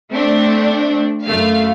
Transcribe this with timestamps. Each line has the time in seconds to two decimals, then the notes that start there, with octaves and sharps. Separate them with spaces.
0.11 A3 C4 D4
1.25 F#2 A3 F5